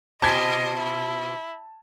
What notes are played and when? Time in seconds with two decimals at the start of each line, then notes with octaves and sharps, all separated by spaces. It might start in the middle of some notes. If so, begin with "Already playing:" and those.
0.22 B2 F4 D#5 A5 G#6 B6
0.78 E4